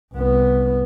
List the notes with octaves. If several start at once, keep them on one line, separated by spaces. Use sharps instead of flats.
C2 B3